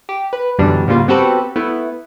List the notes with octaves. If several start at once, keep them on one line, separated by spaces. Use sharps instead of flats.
G4
B4
F#2 B2 D3 E3 G3 D4
G#2 C#3 G3 A#3 F4
B3 C4 F#4 G4 A4 B4
A3 B3 E4